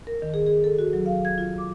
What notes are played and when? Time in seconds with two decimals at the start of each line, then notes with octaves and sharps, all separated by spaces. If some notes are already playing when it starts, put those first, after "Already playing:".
0.07 A#4
0.22 D#3
0.34 G#4
0.47 G#4
0.64 A4
0.79 F#4
0.93 F#3
1.06 F5
1.25 G#6
1.38 F4
1.58 D6